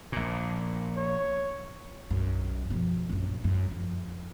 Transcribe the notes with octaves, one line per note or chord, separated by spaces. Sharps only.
A#1 A#2
C#5
B1 F#2
B2 F3
A#1 F#2
F#2
F2